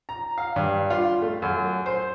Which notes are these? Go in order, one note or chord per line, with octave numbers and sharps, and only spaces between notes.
A#5
F5
G2
F4
A3
F#2
C5